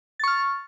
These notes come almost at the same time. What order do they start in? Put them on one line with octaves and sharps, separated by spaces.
A6 C#6 F6